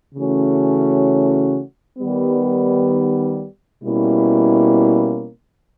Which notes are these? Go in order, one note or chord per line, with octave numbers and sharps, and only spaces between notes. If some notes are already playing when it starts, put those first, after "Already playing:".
C#3 E3 A3 C#4 F#4
D#3 G3 B3
B2 G3 A#3 C#4 E4